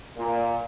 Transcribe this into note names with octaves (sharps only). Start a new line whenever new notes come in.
A#2